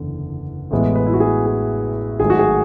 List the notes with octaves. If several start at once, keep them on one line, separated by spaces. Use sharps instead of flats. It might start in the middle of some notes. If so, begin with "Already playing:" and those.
Already playing: F#1 E2 D3
A1 A2 E3 G#3 B3
B4
E4
F#4
G#4
G#4
G#1 G#2 F#3 A3 G#4
F#4
G#4